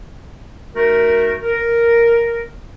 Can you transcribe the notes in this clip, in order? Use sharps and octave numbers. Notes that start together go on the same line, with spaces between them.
A3 D#4 F#4 A#4
A#4